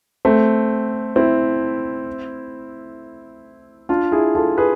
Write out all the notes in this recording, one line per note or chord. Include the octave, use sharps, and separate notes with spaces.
A3 C4
C4 E4
D4 F4
E4 G#4
F4 A4
G#4 B4